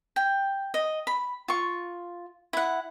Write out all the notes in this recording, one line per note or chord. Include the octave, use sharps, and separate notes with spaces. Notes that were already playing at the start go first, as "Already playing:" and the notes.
G5
D#5
B5
F4 C#6
E4 F#5